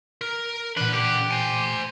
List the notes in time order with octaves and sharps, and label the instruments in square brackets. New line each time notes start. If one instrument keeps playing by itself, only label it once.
[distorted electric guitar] A#4
[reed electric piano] A#2 E3 [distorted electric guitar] D4 F#5 [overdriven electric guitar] B4
[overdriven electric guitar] G4
[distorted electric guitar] C5 G#5